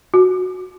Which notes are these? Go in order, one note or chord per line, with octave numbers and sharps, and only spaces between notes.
F#4